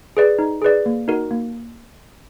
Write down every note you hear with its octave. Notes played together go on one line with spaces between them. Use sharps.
G#4 B4 D5
D#4
G#4 B4 D5
A#3
D#4 F#4 A#4
A#3